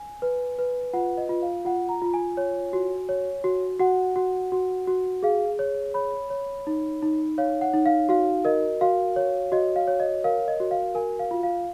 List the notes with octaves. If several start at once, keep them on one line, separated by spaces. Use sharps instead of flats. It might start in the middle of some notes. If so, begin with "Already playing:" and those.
Already playing: G#5
B4
B4
F4 F#5
D#5
F4
F5
F4 F#5
A#5
F4
G#5
C#5
F#4
C#5
F#4
F#4 F#5
F#4
F#4
F#4
G#4 F5
C#5
C#5 B5
C#5
D#4
D#4
C#5 F5
F#5
D#4
F5
F#4 F5
A#4 D#5
F#4 F5
C#5
F#4 D#5
F5
C#5
D#5
A#4 F5
D#5
F#4
F5
A#4 G#5
F5
F4
F5